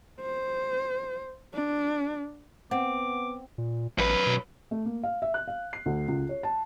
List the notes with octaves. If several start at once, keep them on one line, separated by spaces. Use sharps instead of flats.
C5
D4
B3 C4 F#5 D6
A#2
A1 F#2 B4
B2
A3
A#3
F5
E5
F#6
F5
C7
D2
C#2
C#5
A5